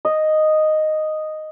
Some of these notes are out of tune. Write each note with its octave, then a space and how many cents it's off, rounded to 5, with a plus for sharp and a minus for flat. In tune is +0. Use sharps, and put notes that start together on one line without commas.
D#5 -5